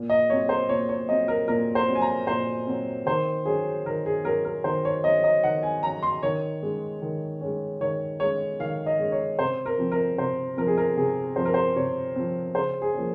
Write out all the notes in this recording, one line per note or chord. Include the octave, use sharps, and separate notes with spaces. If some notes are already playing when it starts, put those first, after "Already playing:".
Already playing: A#2
D#5
F#3 C4 C#5
C5
A#2 C#5
C#5
F#3 C4 D#5
A#4
A#2 A#4
C5
F#3 C4
G#5
A#5
A#2 C5
F#3 C4
D#3 C5
F#3 C#4 G#4
D#3 A#4
G#4
F#3 C#4 A#4
A#4
D#3 C5
C#5
F#3 C#4 D#5
D#5
D#3 F#5
G#5
F#3 C#4 A#5
C6
D#3 C#5
G#3 C#4
D#3
G#3 C#4
D#3 C#5
G#3 C#4 C#5
D#3 F5
D#5
G#3 C#4
C#5
C3 C5
A#4
F3 C4
A#4
C3 C5
F3 C4 A#4
G#4
A#4
C3 G#4
F3 C4 C5
A#4
C5
C3 C#5
F3 C4
C#3 C5
G#4
F3 A#3 C#4